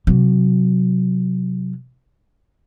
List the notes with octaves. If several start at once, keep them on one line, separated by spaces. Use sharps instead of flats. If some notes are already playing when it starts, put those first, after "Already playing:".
C3 F#3